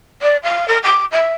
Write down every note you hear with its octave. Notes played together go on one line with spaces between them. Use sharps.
D5
F5
A#4
D6
E5